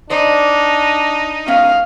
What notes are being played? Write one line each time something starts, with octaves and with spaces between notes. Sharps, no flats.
D4 D#4 C5 D5 D#5
G#3 B3 C#4 F5